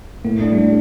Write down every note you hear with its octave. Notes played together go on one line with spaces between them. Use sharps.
A2 A#3
A3 D4
G3
A3 D4